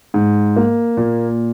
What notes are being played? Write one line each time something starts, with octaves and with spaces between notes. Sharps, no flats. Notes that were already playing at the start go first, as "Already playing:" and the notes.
G#2
A#3
A#2